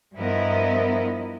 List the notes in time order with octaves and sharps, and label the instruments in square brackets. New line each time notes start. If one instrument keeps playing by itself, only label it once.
[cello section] G2 F3 B3 E4 A#4 D#5